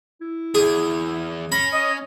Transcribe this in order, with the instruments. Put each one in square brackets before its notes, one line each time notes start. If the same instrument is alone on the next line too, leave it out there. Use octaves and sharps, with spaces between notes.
[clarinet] E4
[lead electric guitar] E2 [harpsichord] G#4
[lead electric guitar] C#4 [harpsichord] B5 [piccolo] A#6
[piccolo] D#5 [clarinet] D#6